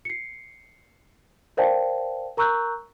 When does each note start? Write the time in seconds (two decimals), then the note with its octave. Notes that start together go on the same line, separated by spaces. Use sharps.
0.05 C7 C#7
1.57 A#4 C5 D5 F5 G5 A5
2.37 A#4 A#5 C#6 E6 F#6 G6